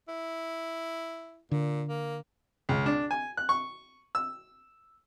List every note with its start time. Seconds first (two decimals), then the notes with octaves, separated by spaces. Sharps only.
0.08 E4
1.51 A#2 D3
1.88 A#3
2.69 C#2
2.86 D4
3.11 G#5
3.37 F#6
3.49 C#6
4.15 E6